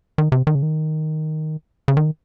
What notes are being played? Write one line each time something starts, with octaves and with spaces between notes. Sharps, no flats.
D#3
C3
D#3
C#3
D#3
C#3
D#3